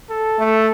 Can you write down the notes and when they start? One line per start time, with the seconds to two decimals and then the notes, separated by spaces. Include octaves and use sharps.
0.10 A4
0.39 A3